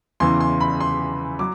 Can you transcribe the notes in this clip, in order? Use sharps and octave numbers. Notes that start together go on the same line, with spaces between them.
E2 C#3 E3 C6
C6
B5
C6
F#3 D6